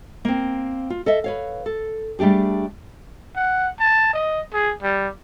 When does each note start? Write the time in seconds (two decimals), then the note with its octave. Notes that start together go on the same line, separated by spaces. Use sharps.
0.25 A#3 C4
0.90 F4
1.06 A4 D#5 E5
1.24 B4 C#5 F5
1.66 A4
2.19 G3 A3 D4 G4 G#4
3.36 F#5
3.79 A5
4.13 D#5
4.53 G#4
4.83 G3